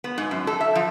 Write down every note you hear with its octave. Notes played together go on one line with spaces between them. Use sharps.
B3
G#2
F#2
A4
E5
F3